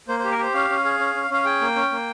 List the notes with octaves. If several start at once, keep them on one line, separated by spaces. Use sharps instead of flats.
A#3 C5
G4 C5
A#4
G4 C5
C#4 F5
C#4
G#4
C#4
C#4
C#4 F5
G#4 G5
A#3
C#4
A#3